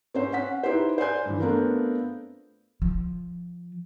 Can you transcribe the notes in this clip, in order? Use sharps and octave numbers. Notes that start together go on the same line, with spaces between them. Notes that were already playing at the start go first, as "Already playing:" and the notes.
C4 C#4 C5
C#4 F#5 B6
D#4 E4 G4 B4 C5
C5 D5 G#5 G6
G2 E3
A3 B3 C4 D4 F4 A#4
F3